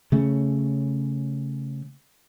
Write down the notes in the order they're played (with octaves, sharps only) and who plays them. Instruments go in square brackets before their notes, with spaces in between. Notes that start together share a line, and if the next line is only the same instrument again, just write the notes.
[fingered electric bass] C#3 A3 C#4